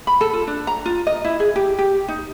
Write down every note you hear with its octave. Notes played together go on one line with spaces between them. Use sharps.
B5
A4
F4
D4
A#5
F4
D#5
E4
G#4
G4
G4
D#4